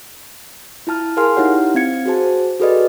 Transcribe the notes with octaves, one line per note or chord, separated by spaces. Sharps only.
E4 F4 A5 F6
G#4 A#4 F5 G#5 C6 F6
D#4 E4 G4 C#5 F#5
C4 F5 G#6 C#7
F#4 G#4 C5 A5
F#4 G#4 A4 B4 D5 D#5